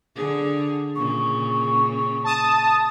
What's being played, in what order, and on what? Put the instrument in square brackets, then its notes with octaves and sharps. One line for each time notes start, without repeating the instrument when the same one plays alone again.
[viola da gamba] D3 G#4
[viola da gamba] A#2 C#3 [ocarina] C#6
[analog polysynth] A5 D#6